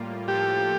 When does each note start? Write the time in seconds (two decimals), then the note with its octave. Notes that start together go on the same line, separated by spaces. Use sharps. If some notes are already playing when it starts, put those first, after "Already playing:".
Already playing: A2 G3 A#3 F4
0.28 A2 F3 A#3 F4 G4 A4